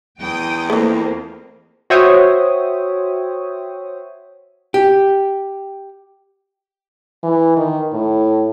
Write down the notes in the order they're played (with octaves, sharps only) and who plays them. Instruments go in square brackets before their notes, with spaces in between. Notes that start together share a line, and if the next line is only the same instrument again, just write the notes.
[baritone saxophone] E2 [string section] G5 D#6
[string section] F2 A#3 [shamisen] E3 A3
[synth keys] F#4 C5 C#5 E5 G5 D#6
[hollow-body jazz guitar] G4
[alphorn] E3
D#3
A2